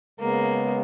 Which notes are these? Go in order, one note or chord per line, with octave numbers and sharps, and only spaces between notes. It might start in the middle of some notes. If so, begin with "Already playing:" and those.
C#3 G#3 A#3 B3